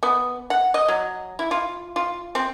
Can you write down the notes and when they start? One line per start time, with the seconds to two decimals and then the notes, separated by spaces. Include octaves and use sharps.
0.03 B3
0.50 F#5
0.74 D#5
0.88 F#3
1.39 E4
1.51 F4
1.96 F4
2.35 C4